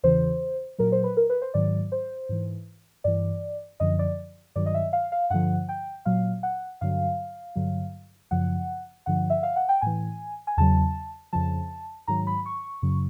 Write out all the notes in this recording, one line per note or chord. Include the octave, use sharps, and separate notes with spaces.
E2 C#3 E3 C5
A#2 F#3 A#4
C5
B4
A#4
B4
C5
G#2 D#3 F#3 D5
C5
G#2 E3
G2 E3 D5
F#2 D3 F3 D#5
D5
G2 D#3 F#3 D5
D#5
E5
F5
F5
G2 D3 F3 F#5
G5
A#2 F#3 F5
F#5
G2 D3 F#3 F5
G2 D3 F#3
F#2 C#3 F3 F#5
G2 D3 F3 F#5
E5
F5
F#5
G5
A2 E3 G#5
G#5
E2 C#3 F#3 A5
F2 C#3 F3 A5
G#2 D#3 F#3 A#5
B5
C#6
F#2 C#3 F#3